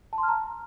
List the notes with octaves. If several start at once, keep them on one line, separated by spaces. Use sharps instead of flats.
A5
C6
F6
A#5